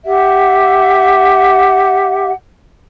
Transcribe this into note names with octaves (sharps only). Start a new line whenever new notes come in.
G4 E5 F#5